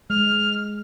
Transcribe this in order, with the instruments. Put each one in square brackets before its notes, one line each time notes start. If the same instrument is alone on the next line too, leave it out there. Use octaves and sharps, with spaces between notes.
[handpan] G#3 [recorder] F6